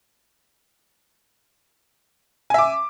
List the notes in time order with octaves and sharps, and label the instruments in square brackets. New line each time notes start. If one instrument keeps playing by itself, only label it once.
[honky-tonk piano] G#5
E5
D6